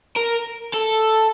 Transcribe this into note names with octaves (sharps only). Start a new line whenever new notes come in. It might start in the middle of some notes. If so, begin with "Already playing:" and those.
A#4
A4